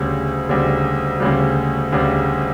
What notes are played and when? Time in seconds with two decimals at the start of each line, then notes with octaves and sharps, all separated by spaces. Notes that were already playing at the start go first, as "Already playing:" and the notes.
Already playing: D2 C#3 G3
0.49 D2 C#3 G3
1.20 D2 C#3 G3
1.92 D2 C#3 G3